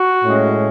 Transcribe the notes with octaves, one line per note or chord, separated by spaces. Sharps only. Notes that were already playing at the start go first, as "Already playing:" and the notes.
Already playing: F#4
A2 G#3 C#4